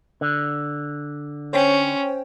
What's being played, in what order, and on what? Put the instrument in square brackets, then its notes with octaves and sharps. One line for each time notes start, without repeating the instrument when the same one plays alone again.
[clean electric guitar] D3
[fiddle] C#4 [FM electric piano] C5 C#5 G5